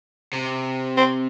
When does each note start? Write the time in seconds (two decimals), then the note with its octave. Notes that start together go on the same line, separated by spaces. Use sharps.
0.33 C3
0.97 C4